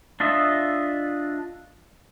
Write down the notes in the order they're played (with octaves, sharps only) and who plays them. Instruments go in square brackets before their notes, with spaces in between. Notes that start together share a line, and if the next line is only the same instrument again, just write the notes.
[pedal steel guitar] D4 F4 D#5 E5